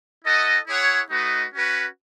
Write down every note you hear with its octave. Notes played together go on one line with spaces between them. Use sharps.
E4 A4 D#5 F#5
E4 G#4 C#5 F#5
A3 D#4 F#4 B4 D#5
C#4 F#4 B4